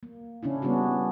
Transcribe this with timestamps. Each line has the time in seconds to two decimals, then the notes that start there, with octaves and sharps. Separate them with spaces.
0.03 A#3
0.43 C#3 C#4 D4 E4
0.62 G3 B3 C#4 D4 F#4